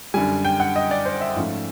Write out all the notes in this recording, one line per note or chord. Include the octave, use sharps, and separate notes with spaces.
F#2 D3 G3 G#5
G5
F#5
D#5
D5
C5
E5
G#2 F3 A3 C#4